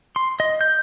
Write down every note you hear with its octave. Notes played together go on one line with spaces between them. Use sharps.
C6
D#5
G6